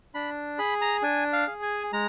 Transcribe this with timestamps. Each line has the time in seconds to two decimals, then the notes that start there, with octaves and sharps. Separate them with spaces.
0.14 D4 B5
0.59 G#4 B5
0.81 A#5
1.03 D4 G#5
1.33 F5
1.47 G#4
1.62 G#5
1.93 G#3 A#5